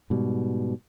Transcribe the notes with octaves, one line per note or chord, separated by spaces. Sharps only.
G#2 B2 G3